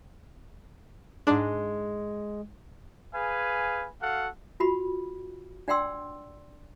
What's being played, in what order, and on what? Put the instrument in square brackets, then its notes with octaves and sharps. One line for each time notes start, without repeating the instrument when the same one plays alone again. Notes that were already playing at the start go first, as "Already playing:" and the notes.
[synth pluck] G#2 D4 [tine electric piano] G#3
[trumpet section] G#4 B4 F5 G#5
F#4 A4 F5 F#5
[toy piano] F4 F#4 B5
D4 D5 F#5 G5 C6 E6